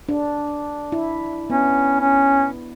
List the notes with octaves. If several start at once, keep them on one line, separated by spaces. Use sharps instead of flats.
D4
E4
B3 C#4
C#4